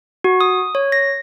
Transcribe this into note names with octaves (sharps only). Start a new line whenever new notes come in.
F#4
D#6
C#5
A#6